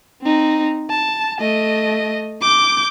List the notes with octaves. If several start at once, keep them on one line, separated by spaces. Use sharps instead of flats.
C4 D#4
A5
A3 D#5
D6 G6